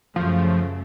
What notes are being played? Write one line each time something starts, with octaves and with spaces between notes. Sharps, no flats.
F#2 C#3 F3 A3